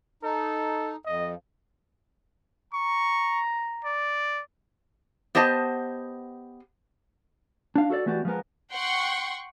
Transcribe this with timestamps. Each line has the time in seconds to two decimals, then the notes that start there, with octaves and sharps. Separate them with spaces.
0.23 D#4 A4
1.06 F2 D#5
2.74 A#5 C#6
3.85 D5
5.35 B3 G4 C5 D#5 A5
7.76 D4 F5
7.90 F#4 A4 C5 D5
8.06 E3 A3 B3 F#4 G4 D5
8.25 F3 G#3 B3 A#4
8.72 F#5 G5 C6 C#6